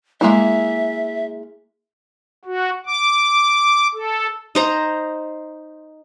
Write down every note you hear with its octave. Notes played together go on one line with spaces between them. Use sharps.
G#3 A#3 E4 E5
F#4
D6
A4
D#4 C5 A#5